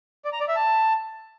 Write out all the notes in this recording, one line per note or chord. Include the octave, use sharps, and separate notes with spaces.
D5
A#5
D5
E5
A5